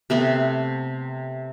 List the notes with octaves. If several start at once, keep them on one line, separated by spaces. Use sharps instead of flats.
C3 A3 B3